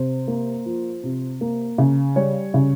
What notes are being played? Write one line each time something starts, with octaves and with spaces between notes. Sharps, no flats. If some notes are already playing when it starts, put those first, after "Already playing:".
Already playing: C3 C5
A#3
F3
C3
A#3
C#3
G3 C#5
C#3